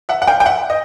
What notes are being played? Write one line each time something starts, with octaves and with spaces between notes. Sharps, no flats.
E5 F#5
F#5
F5 G5
G5
E5 F#5
D#5